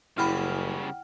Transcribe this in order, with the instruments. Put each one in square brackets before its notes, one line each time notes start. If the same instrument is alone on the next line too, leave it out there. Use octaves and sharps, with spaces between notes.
[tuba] F#1 [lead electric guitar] C#3 G3 [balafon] E4 B5 [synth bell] F#5 G5 F6